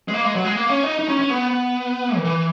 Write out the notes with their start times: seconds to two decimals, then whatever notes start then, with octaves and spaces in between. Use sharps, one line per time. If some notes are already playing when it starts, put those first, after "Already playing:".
0.08 G#3
0.14 A#3
0.25 G#3
0.35 F#3
0.45 G#3
0.56 A#3
0.69 C#4
0.84 D#4
0.99 D#4
1.09 C#4
1.19 C#4
1.30 B3
2.17 D#3
2.25 E3